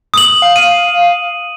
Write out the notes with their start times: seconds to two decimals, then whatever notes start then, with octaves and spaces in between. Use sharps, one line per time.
0.14 D#6 F#7
0.42 F5
0.56 D#7